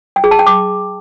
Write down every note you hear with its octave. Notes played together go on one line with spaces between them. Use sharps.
G5
G#4
A5
G5
D6